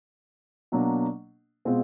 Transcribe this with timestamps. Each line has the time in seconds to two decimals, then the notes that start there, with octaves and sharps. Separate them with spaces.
0.72 B2 F#3 A#3 D4
1.65 B2 G#3 C4 F4